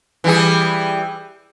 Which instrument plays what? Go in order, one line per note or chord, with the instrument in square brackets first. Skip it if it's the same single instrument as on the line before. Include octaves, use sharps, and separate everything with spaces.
[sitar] E3 G3 G#4